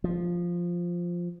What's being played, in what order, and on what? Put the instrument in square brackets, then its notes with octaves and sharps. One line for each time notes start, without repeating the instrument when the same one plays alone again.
[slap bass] F3